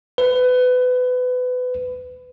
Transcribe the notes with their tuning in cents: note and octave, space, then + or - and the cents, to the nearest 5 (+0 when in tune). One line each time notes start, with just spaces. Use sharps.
B4 +25